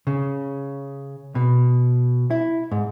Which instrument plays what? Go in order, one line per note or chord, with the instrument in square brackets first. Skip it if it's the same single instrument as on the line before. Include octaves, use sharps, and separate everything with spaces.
[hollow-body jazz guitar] C#3
B2
E4
G#2